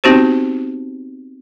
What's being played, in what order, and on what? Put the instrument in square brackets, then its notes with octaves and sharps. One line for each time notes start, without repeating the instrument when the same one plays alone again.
[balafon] B3 C4 D#4 F#4 G4 C5